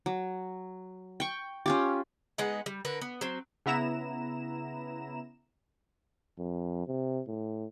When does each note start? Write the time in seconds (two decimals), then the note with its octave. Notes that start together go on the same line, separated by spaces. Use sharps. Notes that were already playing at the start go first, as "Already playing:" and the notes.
0.06 F#3
1.20 G5 C#6
1.66 C#4 F4 G4
2.38 G#3 B3 D#4 F#5
2.66 G3
2.85 D3 A#4 B4
3.01 B3
3.21 F#3 C4
3.66 C#3 B3 E4 A#5 E7
6.39 F2
6.87 C3
7.27 A2